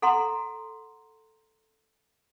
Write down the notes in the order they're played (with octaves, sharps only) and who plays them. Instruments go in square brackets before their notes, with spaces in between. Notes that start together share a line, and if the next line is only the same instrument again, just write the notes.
[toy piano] A4 F#5 A#5 C6